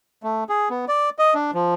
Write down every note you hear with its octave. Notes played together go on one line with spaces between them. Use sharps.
A3
G#4
B3
D5
D#5
D4
F3